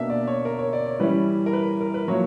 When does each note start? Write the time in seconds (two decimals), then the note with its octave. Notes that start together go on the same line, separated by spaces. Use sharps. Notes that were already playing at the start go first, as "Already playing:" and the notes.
Already playing: B2 A#3 D4 E5
0.10 D5
0.27 C#5
0.45 A#4
0.59 C#5
0.73 D5
0.86 C#5
1.00 E3 G3 C#4 E4 B4
1.46 A#4
1.53 B4
1.81 A#4
1.94 B4
2.08 A#2 F#3 A#3 E4 C#5